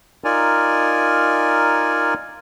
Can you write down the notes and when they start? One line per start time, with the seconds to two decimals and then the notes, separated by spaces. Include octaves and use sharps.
0.24 D#4 F4 A#4 D5 G#5